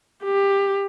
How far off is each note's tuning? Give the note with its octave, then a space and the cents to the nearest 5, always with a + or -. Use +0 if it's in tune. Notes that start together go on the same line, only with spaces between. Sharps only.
G4 +20